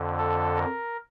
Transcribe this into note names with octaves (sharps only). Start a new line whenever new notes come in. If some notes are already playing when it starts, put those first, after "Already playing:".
Already playing: F2 D3
A4
A#4